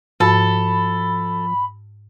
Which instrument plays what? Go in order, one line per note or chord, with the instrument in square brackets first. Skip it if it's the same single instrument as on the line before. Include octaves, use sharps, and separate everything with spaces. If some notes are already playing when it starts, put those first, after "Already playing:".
[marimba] G#2 [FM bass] F3 [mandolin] A4 [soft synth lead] B5